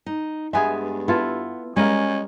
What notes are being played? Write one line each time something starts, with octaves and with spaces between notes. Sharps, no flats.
D#4
G2 G#3 B3 G#4 E5 G#5
B3 E4 F4 A4
G3 G#3 C#4 A#4 F5